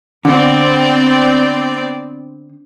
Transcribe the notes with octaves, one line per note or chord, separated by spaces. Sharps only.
D3 B3 C4 D5